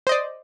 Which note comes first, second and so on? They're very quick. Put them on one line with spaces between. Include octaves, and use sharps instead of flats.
C5 D#5 D5